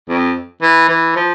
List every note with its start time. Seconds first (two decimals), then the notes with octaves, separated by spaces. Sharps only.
0.09 F2
0.62 E3
0.89 E3
1.16 F3